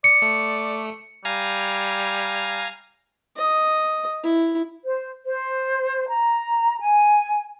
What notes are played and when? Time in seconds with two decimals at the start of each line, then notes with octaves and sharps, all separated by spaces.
0.04 D5 C#7
0.22 A3
1.25 G3 F5 G#5 A#5
3.36 D#5
4.24 E4
4.84 C5
5.27 C5
6.08 A#5
6.79 G#5